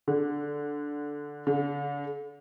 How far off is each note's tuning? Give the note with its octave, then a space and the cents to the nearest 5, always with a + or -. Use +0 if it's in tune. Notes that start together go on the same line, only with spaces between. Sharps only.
D3 -5
D3 -40